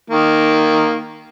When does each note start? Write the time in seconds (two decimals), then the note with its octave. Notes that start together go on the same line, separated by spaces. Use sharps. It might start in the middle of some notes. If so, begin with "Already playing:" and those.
0.10 D#3 A#3